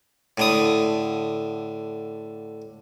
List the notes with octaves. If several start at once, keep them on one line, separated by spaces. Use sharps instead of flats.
A2 D3 D#6